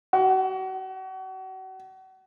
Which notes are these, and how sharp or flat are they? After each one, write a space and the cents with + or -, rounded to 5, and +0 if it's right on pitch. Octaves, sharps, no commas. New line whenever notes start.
F#4 +35